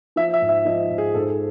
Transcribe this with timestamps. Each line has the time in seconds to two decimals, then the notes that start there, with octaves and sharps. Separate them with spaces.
0.16 F3 E5
0.34 E5
0.42 G#2
0.49 E5
0.65 F3 D#5
0.90 G#2
0.98 G#4
1.14 G#2 A4